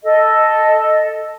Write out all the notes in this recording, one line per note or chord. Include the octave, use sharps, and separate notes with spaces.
A4 D#5